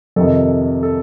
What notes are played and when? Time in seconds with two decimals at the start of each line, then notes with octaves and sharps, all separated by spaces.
0.16 F2 C3 D#3 A4
0.83 A4